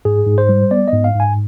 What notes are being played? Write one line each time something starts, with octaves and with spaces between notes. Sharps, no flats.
G#2 G#4
G#2
C5
G3
B3 D5
D#5
G#2
F5
G#2
G#5